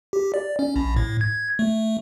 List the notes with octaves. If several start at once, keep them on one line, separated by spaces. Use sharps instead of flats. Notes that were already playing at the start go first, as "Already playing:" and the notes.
G4
D5
C#4
A#1
A2
G#6
A3